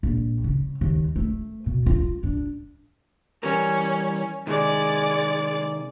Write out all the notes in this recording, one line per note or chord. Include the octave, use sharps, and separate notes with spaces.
A#1
C#3
D#2
A3
B2
F4
D4
E3 G3 C#4 A#4
C3 D#3 G#3 D5